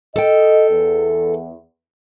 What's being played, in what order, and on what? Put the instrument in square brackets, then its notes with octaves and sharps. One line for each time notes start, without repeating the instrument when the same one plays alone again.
[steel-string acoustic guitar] A4 G5 [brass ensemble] D#5
[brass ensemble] E2